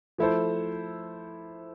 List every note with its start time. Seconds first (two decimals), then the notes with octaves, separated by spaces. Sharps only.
0.18 F3 A3 E4 A4 C5